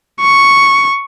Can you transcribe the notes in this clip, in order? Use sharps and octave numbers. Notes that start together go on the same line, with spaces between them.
C#6